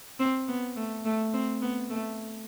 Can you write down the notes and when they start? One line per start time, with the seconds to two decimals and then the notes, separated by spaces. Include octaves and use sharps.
0.20 C4
0.48 B3
0.76 A3
1.05 A3
1.33 C4
1.62 B3
1.90 A3